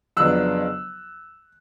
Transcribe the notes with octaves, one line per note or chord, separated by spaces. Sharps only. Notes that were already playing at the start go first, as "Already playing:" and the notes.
F2 C#3 F#3 B3 D4 E6 F#6